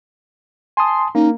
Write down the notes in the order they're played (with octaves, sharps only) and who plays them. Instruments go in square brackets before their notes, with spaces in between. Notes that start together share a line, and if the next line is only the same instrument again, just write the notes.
[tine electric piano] G#5 A5 D#6 [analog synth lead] C6
[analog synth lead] A#3 [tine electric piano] C#4 [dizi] D#4